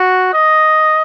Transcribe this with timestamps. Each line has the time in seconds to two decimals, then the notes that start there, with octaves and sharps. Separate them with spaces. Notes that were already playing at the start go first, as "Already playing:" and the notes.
Already playing: F#4
0.33 D#5